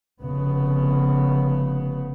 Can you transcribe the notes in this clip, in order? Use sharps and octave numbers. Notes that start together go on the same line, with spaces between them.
F1 C#3 B3